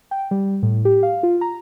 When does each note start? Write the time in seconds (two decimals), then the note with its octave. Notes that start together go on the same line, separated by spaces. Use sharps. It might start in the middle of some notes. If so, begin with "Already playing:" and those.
0.11 G5
0.31 G3
0.63 A2
0.85 G4
1.03 F5
1.23 F4
1.41 A#5